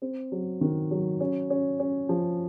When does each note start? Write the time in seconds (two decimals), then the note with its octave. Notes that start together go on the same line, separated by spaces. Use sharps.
0.02 C4
0.32 F#3
0.61 D#3
0.91 F#3
1.20 C#4
1.50 C#4
1.80 C#4
2.09 F3